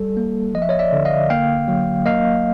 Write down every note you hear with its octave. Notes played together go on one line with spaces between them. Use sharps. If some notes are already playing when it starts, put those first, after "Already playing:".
Already playing: G3 A4
A#3
F3 D#5
E5
C#5 D#5
D5 E5
D3
D#5 F5
A#3 F5 G5
F#3
A#3 D#5 F5